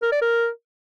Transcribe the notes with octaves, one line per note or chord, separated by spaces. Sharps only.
A#4
D5
A#4